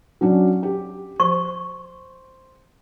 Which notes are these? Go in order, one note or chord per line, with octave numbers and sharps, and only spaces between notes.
F#3 C#4 D4
G4
C5 C#6